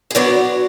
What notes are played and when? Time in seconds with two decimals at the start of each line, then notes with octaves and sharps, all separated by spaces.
0.11 G#4
0.15 D3 F#3 B3 D4 F#4